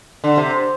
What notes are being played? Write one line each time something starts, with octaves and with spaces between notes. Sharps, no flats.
D3
C3